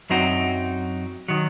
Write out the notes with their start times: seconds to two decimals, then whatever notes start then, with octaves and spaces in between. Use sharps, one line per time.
0.10 F#2 F#3 C4 D#4 F#4
1.28 D#3 F#3